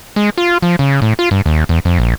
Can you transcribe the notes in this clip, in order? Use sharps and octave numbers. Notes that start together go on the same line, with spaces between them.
G#3
F4
F3
C#3
A2
F4
G2
D#2
E2
F2
A#1